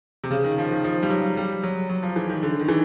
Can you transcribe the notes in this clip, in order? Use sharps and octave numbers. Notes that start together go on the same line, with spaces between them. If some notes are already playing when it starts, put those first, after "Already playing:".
C3
C#3
D#3
F3
D#3
F3
G3
F#3
G3
F#3
F#3
F3
E3
D#3
D3
D#3
E3